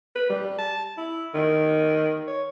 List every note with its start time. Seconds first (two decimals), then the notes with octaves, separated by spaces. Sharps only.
0.15 B4
0.30 G3
0.58 A5
0.97 E4
1.34 D#3
2.27 C#5